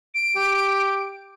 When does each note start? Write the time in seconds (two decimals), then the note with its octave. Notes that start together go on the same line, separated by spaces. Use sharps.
0.14 D7
0.36 G4